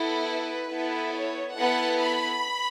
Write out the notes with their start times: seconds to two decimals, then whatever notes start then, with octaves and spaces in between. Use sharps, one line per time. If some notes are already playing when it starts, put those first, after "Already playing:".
Already playing: B3 E4 A4
0.28 B4
0.71 B3 E4 A4
1.14 C#5
1.56 B3 E4 A4 F#5
1.99 B5